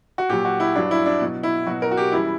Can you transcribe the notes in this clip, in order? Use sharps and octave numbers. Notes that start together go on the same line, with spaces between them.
F#4
A#2 F#3 G4
F#4
E4
G2 F#3 D4
E4
D4
B2 F#3
E4
B2 F#3 F#4
A#4
F#4
G4
F#2 E3 G3 E4